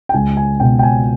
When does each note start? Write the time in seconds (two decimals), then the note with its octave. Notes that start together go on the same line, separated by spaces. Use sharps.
0.09 G5
0.14 C#2 G#5
0.37 G#5
0.60 B2 G5
0.79 G5
0.83 G#5